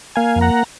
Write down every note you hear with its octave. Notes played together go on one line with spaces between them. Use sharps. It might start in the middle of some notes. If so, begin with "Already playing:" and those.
A#3 F5 G#5
F2
F#5 A#5